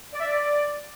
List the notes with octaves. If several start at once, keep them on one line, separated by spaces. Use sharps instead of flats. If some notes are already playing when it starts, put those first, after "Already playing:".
D5
E5
D5